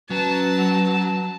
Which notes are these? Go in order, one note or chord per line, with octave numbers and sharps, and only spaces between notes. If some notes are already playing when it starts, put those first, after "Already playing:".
F#3 C#4 B4 A5